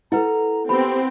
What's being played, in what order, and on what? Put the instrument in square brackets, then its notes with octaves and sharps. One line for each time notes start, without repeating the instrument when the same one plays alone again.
[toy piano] E4 B4 [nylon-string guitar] A4 F#5 [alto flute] A#5
[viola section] B3 C4 [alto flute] G4 [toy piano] B5